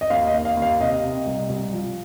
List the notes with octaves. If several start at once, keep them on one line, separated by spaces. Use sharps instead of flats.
D#5
D#2 F5
D#5
D#2
F5
D#2
F5
C3 D#5
C3
C2
C2
F3